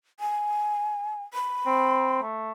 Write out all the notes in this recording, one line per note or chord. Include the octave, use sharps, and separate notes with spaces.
G#5
B5
C4
A3